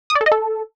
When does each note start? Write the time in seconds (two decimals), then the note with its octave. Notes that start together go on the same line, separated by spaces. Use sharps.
0.10 D#6
0.15 D5
0.21 A4
0.26 D#5
0.32 A4